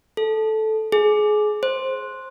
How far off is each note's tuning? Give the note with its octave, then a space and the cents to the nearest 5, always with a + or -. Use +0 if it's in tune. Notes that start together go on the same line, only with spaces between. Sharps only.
A4 -10
G#4 +25
C5 +5